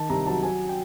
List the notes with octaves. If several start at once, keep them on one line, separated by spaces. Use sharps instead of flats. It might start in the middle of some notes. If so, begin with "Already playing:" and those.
Already playing: D#3 A5
C2 A#5
F#3 A5
F#3 G#5
G5